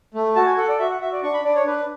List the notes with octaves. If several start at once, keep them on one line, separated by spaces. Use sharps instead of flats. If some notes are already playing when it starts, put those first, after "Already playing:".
A3
F#4 A5
G#5
A4 F#5
D5
F#4 E5
F#5
F#4 E5
D5
D4 C#6
B5
D4 D5
C#5
D4 B4